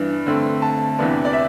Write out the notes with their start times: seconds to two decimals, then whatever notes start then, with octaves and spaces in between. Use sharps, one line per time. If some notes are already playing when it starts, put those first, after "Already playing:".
Already playing: G2 E3 B3 D4
0.26 D3 A3 C4
0.62 A5
0.99 E2 C3 E3 B3 D4
1.25 D5
1.33 E5